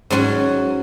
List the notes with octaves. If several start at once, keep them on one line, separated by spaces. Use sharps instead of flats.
G#2 F#3 C#4 F#4 C#5